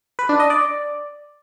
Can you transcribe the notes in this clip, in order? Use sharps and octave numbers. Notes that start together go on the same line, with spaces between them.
B4
D4
D#5
D5